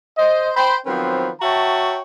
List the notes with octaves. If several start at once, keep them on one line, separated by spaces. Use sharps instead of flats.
C5 D#5
C5 G5 B5
D#3 F3 F#3 B3 C4 B4
F#4 C#5 E5 G5 A5 A#5